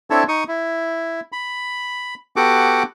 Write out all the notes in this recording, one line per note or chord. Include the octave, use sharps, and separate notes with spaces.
C4 D4 E4 A4 C#5 A5
D#4 C#6 D#6
E4
B5
B3 F#4 G4 A4 F#5 D6